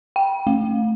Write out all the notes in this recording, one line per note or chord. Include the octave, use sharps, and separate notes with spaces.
G5
A3